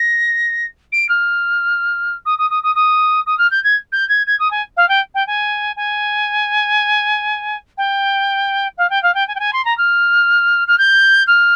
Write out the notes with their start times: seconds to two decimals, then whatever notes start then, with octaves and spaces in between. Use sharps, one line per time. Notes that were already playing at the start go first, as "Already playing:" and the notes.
Already playing: A#6
0.92 D7
1.09 F6
2.25 D#6
2.38 D#6
2.50 D#6
2.63 D#6
2.75 D#6
3.26 D#6
3.38 F6
3.51 G6
3.64 G#6
3.92 G6
4.09 G#6
4.27 G#6
4.39 D#6
4.51 G#5
4.77 F5
4.88 G5
5.14 G5
5.27 G#5
5.76 G#5
7.77 G5
8.78 F5
8.90 G5
9.03 F5
9.14 G5
9.28 G#5
9.35 G5
9.39 G#5
9.53 C6
9.65 A#5
9.77 F6
10.67 F6
10.78 G6
11.27 F6